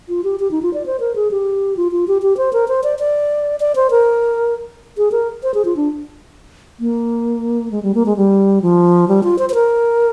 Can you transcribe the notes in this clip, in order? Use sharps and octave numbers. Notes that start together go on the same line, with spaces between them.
F4
G4
G4
D#4
F4
D5
C5
A#4
G#4
G4
F4
F4
G4
G4
C5
A#4
C5
D5
D5
D5
C5
A#4
G#4
A#4
C5
G#4
F4
D4
A#3
G#3
G3
A#3
G#3
G3
F3
G3
F4
C5
C5
A#4